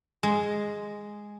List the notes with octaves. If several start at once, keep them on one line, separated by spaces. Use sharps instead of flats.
G#3